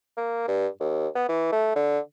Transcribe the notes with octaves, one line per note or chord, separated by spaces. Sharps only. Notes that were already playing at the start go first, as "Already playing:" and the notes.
A#3
G2
D#2
B3
E3
A3
D3